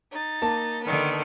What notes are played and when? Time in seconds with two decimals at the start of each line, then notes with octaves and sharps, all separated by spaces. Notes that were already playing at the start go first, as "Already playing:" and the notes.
0.11 D#4 A6
0.42 A#3 A5
0.82 D3 D#3 B3